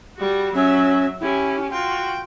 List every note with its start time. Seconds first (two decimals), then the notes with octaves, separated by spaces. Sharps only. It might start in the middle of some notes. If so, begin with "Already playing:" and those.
0.16 G3 F#4
0.55 F#3 C#4 E5
1.20 C#4 E4 G4
1.71 F4 F#4 G5